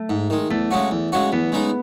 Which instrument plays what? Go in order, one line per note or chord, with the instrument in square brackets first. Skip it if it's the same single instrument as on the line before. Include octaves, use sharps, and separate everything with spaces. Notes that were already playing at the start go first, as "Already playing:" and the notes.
Already playing: [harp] A3
[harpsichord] G#2
D#3 G#3
[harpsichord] E2 [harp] A3
[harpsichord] C#3 G#3 C#4 F#4
E2
C#3 G#3 C#4 F#4
[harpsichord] E2 [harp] B3
[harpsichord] C#3 G#3 D#4